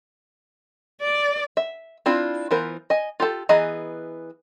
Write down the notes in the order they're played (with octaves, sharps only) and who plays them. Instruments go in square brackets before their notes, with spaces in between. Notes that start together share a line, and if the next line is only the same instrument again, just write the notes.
[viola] D5
[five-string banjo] E5
C4 D4 E4 F4
E3 B3 F4 A#4 C5
D#5 G#5
F4 G4 A4
E3 B3 G#4 D#5 A#5